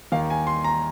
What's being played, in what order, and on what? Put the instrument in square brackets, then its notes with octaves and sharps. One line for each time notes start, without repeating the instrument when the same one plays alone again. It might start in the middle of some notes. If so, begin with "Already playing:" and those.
[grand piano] D#2 D#3 A#3 F5
G#5
C6
A#5